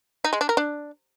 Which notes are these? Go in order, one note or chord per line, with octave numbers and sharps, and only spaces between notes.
D#4
G#3
D4
A#4
D4